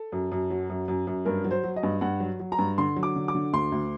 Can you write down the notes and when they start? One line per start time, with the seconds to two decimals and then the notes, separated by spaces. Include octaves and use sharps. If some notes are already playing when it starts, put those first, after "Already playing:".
Already playing: A4
0.12 F#2
0.32 F#2
0.50 F#3
0.70 F#2
0.88 F#2
1.07 F#2
1.25 G2 A#4
1.44 F#3
1.51 C5
1.64 F#3
1.76 D#5
1.83 G2
2.01 G2 F#5
2.20 F#3
2.40 F#3
2.52 A#5
2.59 G2
2.78 D3 C6
2.96 F#3
3.03 D6
3.16 D3
3.28 D6
3.35 D3
3.53 D2 C6
3.72 D2